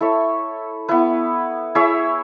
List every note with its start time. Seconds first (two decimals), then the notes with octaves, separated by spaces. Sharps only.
0.01 E4 A4 C#5 E5
0.88 B3 E4 B4
1.75 E4 G#4 C#5 E5